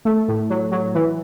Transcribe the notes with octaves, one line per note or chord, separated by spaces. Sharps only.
A3
A2
F#3
F#3
E3